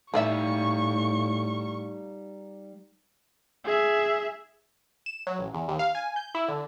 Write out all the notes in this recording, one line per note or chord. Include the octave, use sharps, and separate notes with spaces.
A2 G3 A3 D#4 D5 E5 F5 C#6
G#4 E5
E7
F#3
A1
E2
D#2
F5
G#5
G6
E4
D3